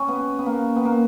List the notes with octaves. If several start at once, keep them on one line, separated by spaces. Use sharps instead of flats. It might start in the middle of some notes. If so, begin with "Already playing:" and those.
Already playing: C#4
B3
B3
A#3
B3
A#3